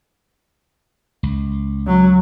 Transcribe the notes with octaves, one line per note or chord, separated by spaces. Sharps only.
C#2
F#3